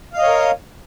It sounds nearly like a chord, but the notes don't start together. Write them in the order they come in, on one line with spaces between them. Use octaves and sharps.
F5 D#5 C#5 A#4